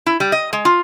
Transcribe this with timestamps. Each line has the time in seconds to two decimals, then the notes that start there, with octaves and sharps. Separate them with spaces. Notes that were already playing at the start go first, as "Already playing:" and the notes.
0.06 E4
0.20 G3
0.32 D#5
0.53 G#3
0.65 F4